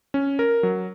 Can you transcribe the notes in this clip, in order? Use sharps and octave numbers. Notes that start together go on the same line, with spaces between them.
C#4
A#4
F#3